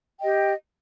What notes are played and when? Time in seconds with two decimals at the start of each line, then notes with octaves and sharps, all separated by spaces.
0.19 G5
0.22 D#5
0.25 G4